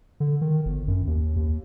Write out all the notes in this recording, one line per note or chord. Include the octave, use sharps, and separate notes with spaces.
D3
D#3
G1
F#2
D#2
D#2